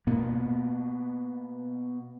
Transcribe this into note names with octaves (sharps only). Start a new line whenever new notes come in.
B2 A#3 B3